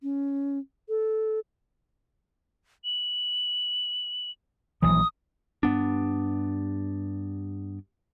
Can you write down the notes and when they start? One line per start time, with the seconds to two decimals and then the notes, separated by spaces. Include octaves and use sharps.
0.03 C#4
0.89 A4
2.85 F#7
4.82 A#1 E3 F#3 D#6
5.63 G2 B3 D4